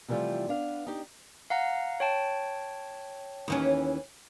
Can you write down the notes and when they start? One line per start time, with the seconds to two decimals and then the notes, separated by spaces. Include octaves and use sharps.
0.08 C3 E3 F3 G3 A3 F4
0.48 B3 D4 F5
0.87 D#4 G4
1.50 F5 F#5 A#5
2.00 C#5 G5 A5
3.48 D#2 E3 C#4